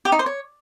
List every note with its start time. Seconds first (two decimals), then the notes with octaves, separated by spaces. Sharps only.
0.05 G4
0.12 D#4
0.19 C5
0.26 C#5